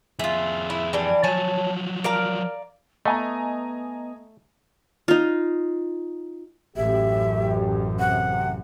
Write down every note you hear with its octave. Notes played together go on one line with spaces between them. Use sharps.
F2 F4 G#4 E5
E4
E3 G3 D4
F3 F#3 C#5 G#5 A5
A#4 D5 F5 A#5
A3 B3 D#5 G#5 A#5
D#4 F4
A1 F#2 G4 E5
C3 F#5